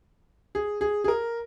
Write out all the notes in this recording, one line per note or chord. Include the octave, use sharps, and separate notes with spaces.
G#4
G#4
G#4
A#4